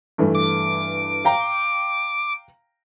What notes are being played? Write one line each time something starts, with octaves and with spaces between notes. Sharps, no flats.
G2 E3 A3
D6
F5 G5 A#5